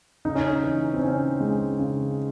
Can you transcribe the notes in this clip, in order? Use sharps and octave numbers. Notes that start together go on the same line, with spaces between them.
C#3 D#4
C#4
D#4
E3
C4
C#3 C#4
G#3
C#3